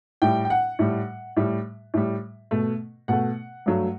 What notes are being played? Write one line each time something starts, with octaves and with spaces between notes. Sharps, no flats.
A2 G3 G5
G5
F#5
A2 G3
A2 G3
A2 G3
B2 A3
B2 A3 F#5
G2 F#3 A3